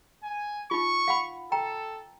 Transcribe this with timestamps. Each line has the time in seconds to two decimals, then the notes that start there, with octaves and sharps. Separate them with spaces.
0.23 G#5
0.71 D#4 F4 C#6
1.08 F5 F#5 B5
1.52 A4 G5 A#5